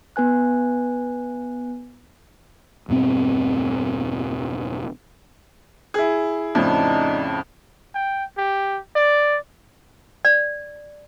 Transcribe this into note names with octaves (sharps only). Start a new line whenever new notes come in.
B3 B4 G#5 F#6
E1 G2 B2 C4
E4 G#4
F2 A2 C#3 D4 D#4
G5
G4
D5
D5